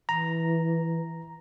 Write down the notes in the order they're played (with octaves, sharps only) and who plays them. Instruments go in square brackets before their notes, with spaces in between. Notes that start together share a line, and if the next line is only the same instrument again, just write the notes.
[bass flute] E3 [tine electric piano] A#5